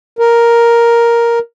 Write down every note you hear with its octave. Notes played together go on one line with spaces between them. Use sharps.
A#4